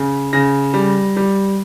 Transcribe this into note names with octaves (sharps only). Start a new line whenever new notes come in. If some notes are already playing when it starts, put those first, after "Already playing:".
Already playing: C#3
C#3 A#6
G3
G3